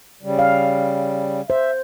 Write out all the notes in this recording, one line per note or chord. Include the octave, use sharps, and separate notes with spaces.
C#3 G3
F5
C5 E5